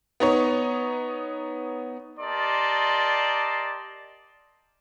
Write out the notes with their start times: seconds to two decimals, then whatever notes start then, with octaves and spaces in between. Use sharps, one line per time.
0.20 B3 D#4 C#5
2.20 G4 A#4 D5 D#5 A5 C6